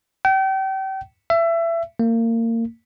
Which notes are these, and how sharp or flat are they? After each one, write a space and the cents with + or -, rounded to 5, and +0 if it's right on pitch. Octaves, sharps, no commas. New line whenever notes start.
G5 -35
E5 +25
A#3 -30